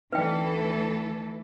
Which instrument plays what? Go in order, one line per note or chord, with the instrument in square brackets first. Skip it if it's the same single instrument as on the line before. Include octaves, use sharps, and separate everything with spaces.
[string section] D2 A4 [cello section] E3 [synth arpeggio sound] C4 D#4 D5 [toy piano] B4 G5